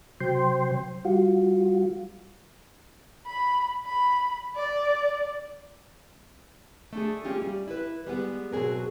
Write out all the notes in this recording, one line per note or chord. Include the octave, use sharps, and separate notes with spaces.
C3 F#3 C5 G5 C6
G3 F4 F#4
B5
B5
D5
A3 D4 G#4
A#3 C#4 F4 G4
G3
E4 B4
G3 G#3 B3
B2 F#3 C4 G#4 A#4